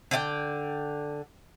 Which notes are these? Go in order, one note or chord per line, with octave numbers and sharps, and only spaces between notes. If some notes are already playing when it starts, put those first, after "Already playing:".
D3 D5 D#5 G5